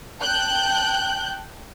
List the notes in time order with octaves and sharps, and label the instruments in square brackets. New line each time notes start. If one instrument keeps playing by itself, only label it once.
[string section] G5 A5 F#6 G6